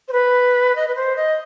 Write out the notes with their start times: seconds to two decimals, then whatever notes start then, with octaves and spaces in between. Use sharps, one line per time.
0.08 C5
0.13 B4
0.76 D#5
0.88 B4
0.96 C5
1.16 D#5